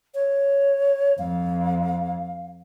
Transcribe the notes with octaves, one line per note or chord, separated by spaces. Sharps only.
C#5
F2 F5